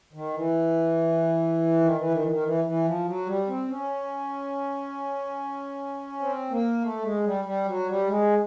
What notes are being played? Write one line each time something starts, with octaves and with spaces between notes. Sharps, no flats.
D#3
E3
D#3
E3
D#3
E3
D#3
E3
E3
F3
F#3
G3
C4
C#4
C4
A#3
A3
G#3
G3
G3
F#3
G3
G#3